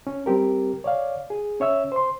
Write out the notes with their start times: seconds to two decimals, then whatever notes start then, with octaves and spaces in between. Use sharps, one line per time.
0.07 C#4
0.26 G3 C4 G4 A#4
0.84 C#5 D5 F5
1.30 G#4
1.60 C#4 C#5 E5 E6
1.92 C5 C6